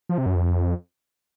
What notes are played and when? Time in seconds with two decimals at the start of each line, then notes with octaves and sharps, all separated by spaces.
0.09 F3
0.18 C3
0.26 F#2
0.35 F2